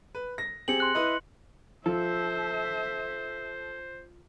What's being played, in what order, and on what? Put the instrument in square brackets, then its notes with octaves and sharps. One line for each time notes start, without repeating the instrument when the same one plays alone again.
[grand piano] B4
A#6
[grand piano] C4 G4 G#4 [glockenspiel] C#7 F#7
[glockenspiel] C6 F#6
[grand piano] E4 B4 D#5
[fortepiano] F3 [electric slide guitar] A4 [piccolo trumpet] C5 [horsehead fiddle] E5